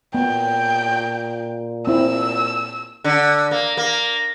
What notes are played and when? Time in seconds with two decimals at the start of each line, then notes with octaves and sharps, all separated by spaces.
0.14 A#2 B3 G5
1.87 C4 E4 E6
3.04 D3
3.51 A#3
3.77 A#3